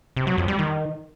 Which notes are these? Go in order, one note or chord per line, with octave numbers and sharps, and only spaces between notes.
C3
F#3
F2
G3
D#3